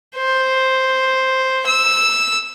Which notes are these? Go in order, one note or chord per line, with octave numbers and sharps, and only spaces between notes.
C5
E6